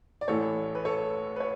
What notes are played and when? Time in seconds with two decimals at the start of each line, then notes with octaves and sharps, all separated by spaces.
0.21 D5
0.28 A1 A2 E3 A3 A4 C#5
0.75 B4
0.85 A4 C#5
1.36 B4
1.40 C#5